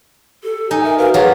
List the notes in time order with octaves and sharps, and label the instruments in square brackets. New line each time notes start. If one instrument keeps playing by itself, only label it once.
[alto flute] G4 [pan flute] A4
[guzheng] D#4 [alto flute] G#5
[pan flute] A#4 [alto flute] E5
[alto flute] F#4 [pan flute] A#4 [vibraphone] B4 F5
[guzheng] F#3 F4 [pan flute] G4 [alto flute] G#4